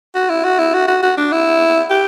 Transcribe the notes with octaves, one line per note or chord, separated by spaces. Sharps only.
F#4
E4
F#4
E4
F#4
F#4
F#4
D4
E4
G4